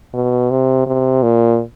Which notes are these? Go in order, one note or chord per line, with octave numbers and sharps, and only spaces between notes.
B2
C3
C3
A#2